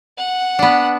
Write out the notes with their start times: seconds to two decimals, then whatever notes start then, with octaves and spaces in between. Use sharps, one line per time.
0.18 F#5
0.59 B3 D4